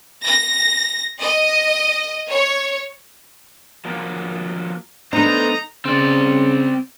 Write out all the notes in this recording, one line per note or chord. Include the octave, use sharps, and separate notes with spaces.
A#6
D#5
C#5
F3 F#3 A#3
A3 B3 D4 D#4 C5 A#5
C#3 C4 D5